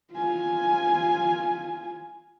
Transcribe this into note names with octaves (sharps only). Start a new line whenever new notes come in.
F4 G#5